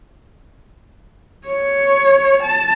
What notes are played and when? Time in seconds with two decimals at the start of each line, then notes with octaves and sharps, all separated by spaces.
1.47 C#5
2.43 A5